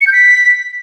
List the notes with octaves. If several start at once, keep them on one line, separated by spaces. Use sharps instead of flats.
C#7
G6
B6